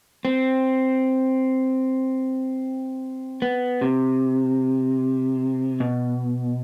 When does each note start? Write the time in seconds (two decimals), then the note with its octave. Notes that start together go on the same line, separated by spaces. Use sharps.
0.25 C4
3.42 B3
3.81 C3
5.80 B2